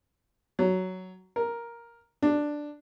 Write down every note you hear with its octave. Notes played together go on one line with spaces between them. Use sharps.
F#3
A#4
D4